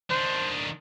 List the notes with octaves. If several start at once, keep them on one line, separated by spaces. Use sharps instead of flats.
D#3 D4 C5